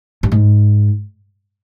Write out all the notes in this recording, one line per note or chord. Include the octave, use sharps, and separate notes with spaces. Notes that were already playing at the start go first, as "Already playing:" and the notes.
G2
G#2